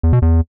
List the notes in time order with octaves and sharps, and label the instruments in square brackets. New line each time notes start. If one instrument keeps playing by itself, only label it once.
[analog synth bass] E2
B2
E2